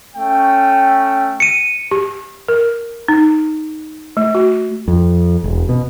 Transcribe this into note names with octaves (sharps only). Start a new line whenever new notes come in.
A3 C#4 G5
C#7 D#7
G4
A#4
D#4
A3
F#4
F2
E1
B2